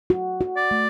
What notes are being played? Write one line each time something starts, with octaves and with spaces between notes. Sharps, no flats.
F#4
F#4
D5
A3